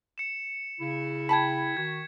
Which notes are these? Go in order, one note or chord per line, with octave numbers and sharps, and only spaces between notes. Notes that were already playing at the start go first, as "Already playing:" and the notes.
C#7 E7
C#3 E4
G5 A5 B5 G#6 B6
D#3 F#4 G#6